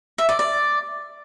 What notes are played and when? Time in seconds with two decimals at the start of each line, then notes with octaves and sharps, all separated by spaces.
0.18 E5
0.29 D5
0.39 D5